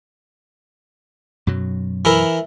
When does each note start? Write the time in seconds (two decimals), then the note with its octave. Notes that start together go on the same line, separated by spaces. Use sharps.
1.47 F#2 B2 F#3
2.05 E3 E4 A#4